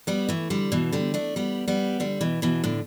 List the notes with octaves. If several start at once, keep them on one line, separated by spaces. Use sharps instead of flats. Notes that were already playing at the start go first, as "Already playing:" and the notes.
G3 B3
E3 A3
D3 G3
B2 E3
D3 G3
A3 D4
G3 B3
G3 B3
D3 G3
B2 E3
B2 E3
A2 D3